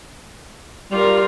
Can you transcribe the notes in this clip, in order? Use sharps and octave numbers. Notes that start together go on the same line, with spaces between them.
G3 F4 A#4